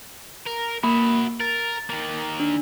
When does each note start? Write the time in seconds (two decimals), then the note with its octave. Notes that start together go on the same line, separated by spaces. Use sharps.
0.46 A#4
0.83 A#3 F#4 E5 B5
1.40 A#4 A6
1.90 D#3 A#3
2.40 D4